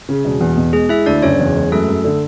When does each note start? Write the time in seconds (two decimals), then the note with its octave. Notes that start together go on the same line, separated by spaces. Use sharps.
0.09 C#3
0.25 E1
0.41 E2
0.57 B2
0.73 G#3 G#4
0.89 G#3 E4 E5
1.06 D2 D4 D5
1.23 F#1 C#4 C#5
1.39 E2
1.56 G#3
1.72 F#2 A3 A4
1.88 F#2
2.04 D3